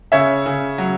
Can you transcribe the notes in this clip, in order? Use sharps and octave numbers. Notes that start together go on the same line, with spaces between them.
C#3 C#5 E5
C#3
F#3